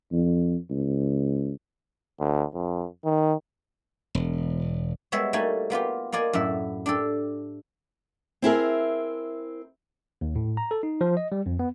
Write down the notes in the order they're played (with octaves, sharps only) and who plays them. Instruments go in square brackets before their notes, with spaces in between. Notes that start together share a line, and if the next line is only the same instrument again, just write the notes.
[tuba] F2
C#2
[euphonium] D2
F2
D#3
[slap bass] E1
[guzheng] G3 G#3 B3 C#5 E5
G3 A3 A#3 D#4 F#4 G#5
A#3 B3 F4 G4
A#3 F4 D5 D#5 G#5
F#2 A2 E4 E5
D4 G4 A4
[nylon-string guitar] C4 E4 G#4 A#4
[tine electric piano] D#2
A2
A#5
A4
D#4
F3
D#5
G3
F2
B3